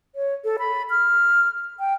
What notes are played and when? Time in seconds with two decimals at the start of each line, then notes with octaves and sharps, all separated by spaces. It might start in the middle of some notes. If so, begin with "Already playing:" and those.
0.15 C#5
0.44 A4
0.59 B5
0.90 F6
1.79 G5